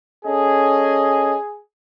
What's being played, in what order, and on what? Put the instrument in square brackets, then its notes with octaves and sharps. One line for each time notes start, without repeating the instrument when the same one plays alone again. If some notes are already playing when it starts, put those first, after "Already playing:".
[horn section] C#4 A4 D#5 [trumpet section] G#4